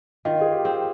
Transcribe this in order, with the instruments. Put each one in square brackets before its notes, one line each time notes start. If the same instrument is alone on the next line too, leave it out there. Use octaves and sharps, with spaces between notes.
[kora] D#3 [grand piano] F4
[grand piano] G#4
G4
[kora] C4